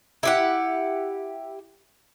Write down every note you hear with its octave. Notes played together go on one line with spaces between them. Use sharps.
E4 G4 F#5